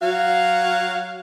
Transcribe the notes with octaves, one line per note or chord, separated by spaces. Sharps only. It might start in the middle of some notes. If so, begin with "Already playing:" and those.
F#3 F#4 F5